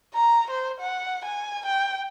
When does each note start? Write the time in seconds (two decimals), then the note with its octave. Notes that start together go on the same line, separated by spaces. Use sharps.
0.14 A#5
0.51 C5
0.81 F#5
1.25 G#5
1.66 G5